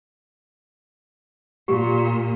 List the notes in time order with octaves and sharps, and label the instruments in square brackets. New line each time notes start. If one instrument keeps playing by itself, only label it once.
[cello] A#2 [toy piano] G4